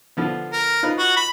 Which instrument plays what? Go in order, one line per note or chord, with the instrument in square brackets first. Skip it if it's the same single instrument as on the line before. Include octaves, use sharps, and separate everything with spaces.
[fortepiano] D3 F3 B3
[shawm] A#4
[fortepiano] D#4 F4 B4
[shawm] F#4
B5